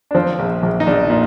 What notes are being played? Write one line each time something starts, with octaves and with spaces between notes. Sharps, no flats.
D4
F3 C4
A#1
A#1
D#4
A#1 D4
A#2